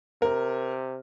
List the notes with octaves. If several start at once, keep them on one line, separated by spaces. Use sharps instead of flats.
C3 A#4